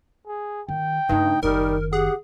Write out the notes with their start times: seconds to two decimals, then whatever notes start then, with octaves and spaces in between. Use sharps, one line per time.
0.27 G#4
0.69 D#3 G5
1.09 G2 C#3 A3 D#4
1.43 F#1 D#3 G3 D#4 A#4
1.93 G4 G#4 F#5